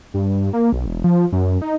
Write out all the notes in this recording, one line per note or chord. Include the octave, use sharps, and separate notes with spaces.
G2
A#3
B1
E1
F3
F#2
D#4